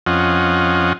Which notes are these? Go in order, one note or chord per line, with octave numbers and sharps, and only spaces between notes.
F2 C#4 F4 D#5 F#5